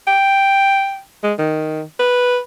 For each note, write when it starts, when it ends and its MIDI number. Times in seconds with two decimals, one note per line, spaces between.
0.07 1.00 79
1.23 1.34 56
1.39 1.82 51
1.99 2.40 71